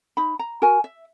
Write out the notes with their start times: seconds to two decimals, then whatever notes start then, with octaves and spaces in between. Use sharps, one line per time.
0.17 D#4 B5
0.39 A#5
0.62 F#4 A#4 G#5
0.84 E5